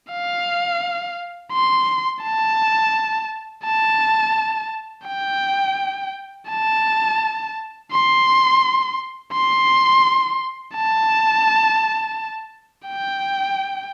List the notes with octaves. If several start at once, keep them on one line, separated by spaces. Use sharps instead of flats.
F5
C6
A5
A5
G5
A5
C6
C6
A5
G5